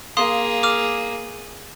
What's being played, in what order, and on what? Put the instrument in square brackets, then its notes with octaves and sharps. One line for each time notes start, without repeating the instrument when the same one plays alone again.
[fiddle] A#3 [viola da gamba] G#4 [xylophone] F5 C6 D#6
[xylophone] D6 F6